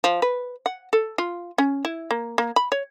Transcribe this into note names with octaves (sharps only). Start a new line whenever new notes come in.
F3
B4
F#5
A4
F4
C#4
E4
A#3
A#3
B5
C#5